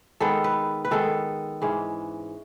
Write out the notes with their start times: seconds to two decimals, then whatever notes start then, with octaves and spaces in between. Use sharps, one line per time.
0.20 D#3 G#3 B3 A4
0.44 B4
0.85 B4
0.91 D#3 G#3 B3 A4
1.62 G#2 E3 G#3 C#4